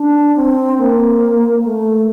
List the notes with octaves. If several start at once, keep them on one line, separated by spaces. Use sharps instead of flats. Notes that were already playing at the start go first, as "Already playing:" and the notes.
Already playing: D4
C4
A#3
A3